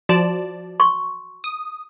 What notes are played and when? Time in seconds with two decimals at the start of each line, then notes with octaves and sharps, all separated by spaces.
0.09 F3 F#4 D5 A5
0.80 C6 C#6
1.44 D#6